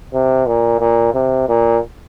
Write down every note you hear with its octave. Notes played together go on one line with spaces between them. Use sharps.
C3
A#2
A#2
C3
A#2